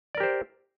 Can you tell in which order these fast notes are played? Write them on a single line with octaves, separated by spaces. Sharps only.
D5 A#4 G4 C5